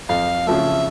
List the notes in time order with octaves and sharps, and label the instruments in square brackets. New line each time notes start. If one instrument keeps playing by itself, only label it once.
[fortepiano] F2 [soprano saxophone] F5
[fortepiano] C#3 F3 A3 [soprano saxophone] E5